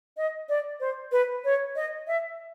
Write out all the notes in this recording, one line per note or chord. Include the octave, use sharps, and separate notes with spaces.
D#5
D5
C5
B4
C#5
D#5
E5